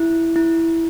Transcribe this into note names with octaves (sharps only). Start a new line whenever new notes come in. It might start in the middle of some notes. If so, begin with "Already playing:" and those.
Already playing: E4
E4